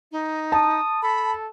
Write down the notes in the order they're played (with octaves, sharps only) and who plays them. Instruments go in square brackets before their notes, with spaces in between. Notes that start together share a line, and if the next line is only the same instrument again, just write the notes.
[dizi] D#4
[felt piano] A5 [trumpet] D#6
[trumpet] A4 [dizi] B5